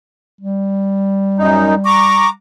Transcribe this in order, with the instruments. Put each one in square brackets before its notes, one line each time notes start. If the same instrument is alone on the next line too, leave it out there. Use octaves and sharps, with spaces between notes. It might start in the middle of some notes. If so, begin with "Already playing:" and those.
[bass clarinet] G3
[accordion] F#2 D#4
[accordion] A#5 D6 [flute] C#6